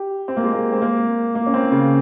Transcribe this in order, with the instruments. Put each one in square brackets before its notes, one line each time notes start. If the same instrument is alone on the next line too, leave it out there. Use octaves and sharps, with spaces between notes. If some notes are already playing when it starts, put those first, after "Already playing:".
Already playing: [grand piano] G4
C4
A#3
G#3
A#3
C4
A#3
A#3
C#4
C4
C#3